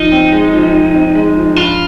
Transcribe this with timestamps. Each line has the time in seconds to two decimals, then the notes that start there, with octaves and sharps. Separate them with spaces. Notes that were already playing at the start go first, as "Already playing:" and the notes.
Already playing: F3 D#4
0.12 C4
0.32 G#3
0.53 F3
0.74 F3
0.94 C4
1.15 G#3
1.36 F3
1.57 G2 F4